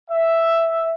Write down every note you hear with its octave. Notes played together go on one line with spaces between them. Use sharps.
E5